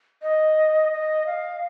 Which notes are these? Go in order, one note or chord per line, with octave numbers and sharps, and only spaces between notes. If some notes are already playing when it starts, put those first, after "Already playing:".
D#5
D#5
F5